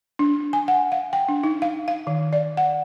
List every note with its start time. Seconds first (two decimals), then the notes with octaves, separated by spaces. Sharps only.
0.19 D4
0.53 G#5
0.68 F#5
0.92 F5
1.13 G5
1.29 D4
1.43 D#4
1.62 F5
1.88 F5
2.07 D#3
2.33 D5
2.57 F#5